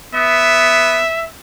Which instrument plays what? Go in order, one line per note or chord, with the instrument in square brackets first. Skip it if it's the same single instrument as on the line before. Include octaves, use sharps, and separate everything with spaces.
[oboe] B3 [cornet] E5